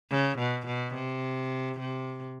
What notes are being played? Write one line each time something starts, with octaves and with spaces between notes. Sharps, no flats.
C#3
B2
B2
C3
C3